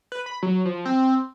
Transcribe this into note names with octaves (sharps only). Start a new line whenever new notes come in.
B4
B5
F#3
F3
C4